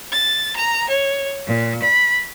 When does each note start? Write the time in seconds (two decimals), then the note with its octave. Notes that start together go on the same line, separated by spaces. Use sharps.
0.11 A6
0.55 A#5
0.89 C#5
1.46 A#2
1.81 B5